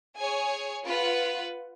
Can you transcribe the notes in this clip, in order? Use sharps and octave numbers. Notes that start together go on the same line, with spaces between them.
G#4 C#5 G#5
F4 B4 F#5